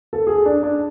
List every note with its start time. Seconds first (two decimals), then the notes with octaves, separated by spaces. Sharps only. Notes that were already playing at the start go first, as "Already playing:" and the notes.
0.13 A4
0.27 G#4
0.46 D4
0.63 D4